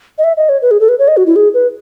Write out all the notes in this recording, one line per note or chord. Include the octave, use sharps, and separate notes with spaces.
D#5
E5
D#5
C#5
B4
G#4
A4
B4
C#5
D#5
F#4
E4
G#4
B4